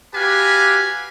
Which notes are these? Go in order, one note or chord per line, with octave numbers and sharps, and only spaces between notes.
F#4 G4 B4 F5 G#5